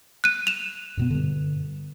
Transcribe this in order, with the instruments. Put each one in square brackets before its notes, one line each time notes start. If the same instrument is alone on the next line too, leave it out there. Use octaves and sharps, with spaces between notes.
[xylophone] F#6 D#7
E7 F7
[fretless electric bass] F#2 B2 B3
G2 D3